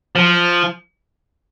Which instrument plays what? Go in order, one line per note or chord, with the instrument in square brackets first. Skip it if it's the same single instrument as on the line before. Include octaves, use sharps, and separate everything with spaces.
[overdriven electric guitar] F3